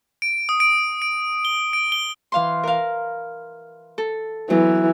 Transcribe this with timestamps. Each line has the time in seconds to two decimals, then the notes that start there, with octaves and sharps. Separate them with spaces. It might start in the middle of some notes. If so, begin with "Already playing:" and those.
0.22 D7
0.49 D#6
0.60 D7
1.02 D7
1.45 G7
1.73 D7
1.92 G7
2.32 E3 F5 C6
2.63 A#4 F5
3.98 A4
4.50 E3 F#3 B3